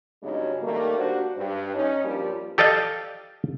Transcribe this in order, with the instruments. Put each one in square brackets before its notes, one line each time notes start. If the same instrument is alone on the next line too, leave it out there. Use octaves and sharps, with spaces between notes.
[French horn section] G2 C#3 F#3 G#3 B3 D#4
D#3 G3 A3 A#3
D4 F#4 G4 C5
G2
C#4 D#4
G2 F3 G3 A#3 F4
[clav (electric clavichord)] G4 A4 D5 D#5 F5 G5